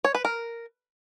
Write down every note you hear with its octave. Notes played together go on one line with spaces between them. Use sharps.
C#5
B4
A#4